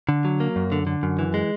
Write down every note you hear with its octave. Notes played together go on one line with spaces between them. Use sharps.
D3
F#3
A#3
F#2
D3
D3
F#2
E3
G#3